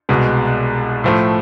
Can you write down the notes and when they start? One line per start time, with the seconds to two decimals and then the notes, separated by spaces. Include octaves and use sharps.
0.09 C2 B2 G#3
1.04 A2 F3 A3